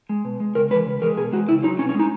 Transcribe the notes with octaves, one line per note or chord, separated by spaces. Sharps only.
G#3
B2
G#3
C#3 A#4
E3 G#3 B4
C#3
E3 G#3 A#4
B2 G#4
G#3 F#4
C#3 E4
F#3 D#4
B2 C#4
C#4
G#3
D#4